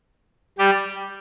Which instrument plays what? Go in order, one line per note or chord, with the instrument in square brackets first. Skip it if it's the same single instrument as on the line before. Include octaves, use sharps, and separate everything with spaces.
[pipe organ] G3 G4